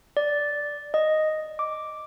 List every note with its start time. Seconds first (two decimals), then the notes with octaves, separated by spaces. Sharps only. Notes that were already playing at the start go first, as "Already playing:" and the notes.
0.17 D5
0.94 D#5
1.59 D6